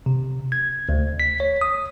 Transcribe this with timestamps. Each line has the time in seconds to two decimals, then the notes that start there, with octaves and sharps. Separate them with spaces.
0.06 C3
0.52 G#6
0.89 D2
1.20 B6
1.40 C#5
1.61 D#6